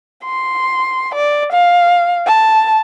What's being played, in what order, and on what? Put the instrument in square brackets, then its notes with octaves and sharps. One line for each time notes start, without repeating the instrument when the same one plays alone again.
[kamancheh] C6
D5
F5
A5